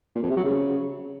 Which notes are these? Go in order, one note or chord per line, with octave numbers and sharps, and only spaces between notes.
A#2
F2
C3
F#3
C#3